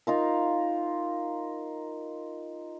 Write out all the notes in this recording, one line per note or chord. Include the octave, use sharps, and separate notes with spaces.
D#4 F4 A#4